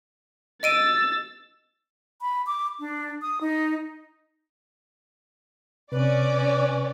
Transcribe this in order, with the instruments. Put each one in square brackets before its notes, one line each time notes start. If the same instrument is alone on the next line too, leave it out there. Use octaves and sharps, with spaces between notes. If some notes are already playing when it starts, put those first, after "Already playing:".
[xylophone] D#5 D7 D#7 [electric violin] E6 A6
[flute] B5
D6
D4
D#6
D#4
[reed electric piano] C3 [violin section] C#4 D5 [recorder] B4